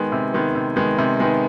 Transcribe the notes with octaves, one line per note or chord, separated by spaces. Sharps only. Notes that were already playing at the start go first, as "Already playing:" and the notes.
Already playing: D#3 G#3 B3
C3
D#3 G#3 B3
C3
D#3 G#3 B3
C3
D#3 G#3 B3